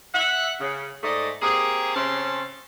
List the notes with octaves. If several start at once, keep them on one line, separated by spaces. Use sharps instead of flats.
E5 F#5
C#3
G#2 A3 D5 D#5
A#3 C4 G4 G#4
C#3 C4 C#4 A5 C6